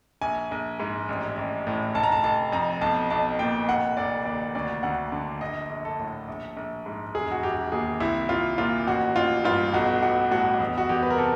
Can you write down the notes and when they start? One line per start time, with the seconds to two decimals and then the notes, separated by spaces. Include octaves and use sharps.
0.21 A#1 G#5
0.51 A#1
0.80 G#2
1.09 A1
1.37 A1
1.67 A2
1.95 F1 A5
2.03 A#5
2.12 A5
2.24 F1 A5
2.52 F2 A#5
2.81 B1 A5
3.10 B1 A5
3.39 A#2 G5
3.68 F1 F#5
3.97 F1 D5
4.25 D#2 D5
4.55 D2 D5
4.83 D2 F#5
5.12 D3
5.41 A#1 D#5
5.70 A#1
5.85 A4
5.99 A2
6.28 A#1
6.56 A#1
6.86 G#2
7.15 E1 G#4
7.32 F#4
7.43 E1 G4
7.72 D#2 G#4
8.00 C2 E4
8.29 C2 F4
8.58 A#2 F4
8.87 A1 F#4
9.16 A1 F4
9.44 G2 F4
9.74 B1 F#4
10.02 B1 F#4
10.31 A2 F#4
10.60 E2
10.78 F#4
10.89 E2 G4
11.03 B4
11.10 A#4
11.18 C3 A4